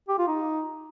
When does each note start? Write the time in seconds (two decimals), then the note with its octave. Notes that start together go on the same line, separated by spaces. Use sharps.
0.09 G4
0.19 F4
0.28 D#4